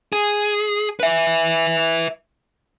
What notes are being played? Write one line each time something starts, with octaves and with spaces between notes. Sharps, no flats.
G#4
B4 E5